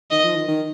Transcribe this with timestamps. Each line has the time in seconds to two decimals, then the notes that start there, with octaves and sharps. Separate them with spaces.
0.11 D#3 D#5
0.24 F3
0.36 D#3
0.48 D#3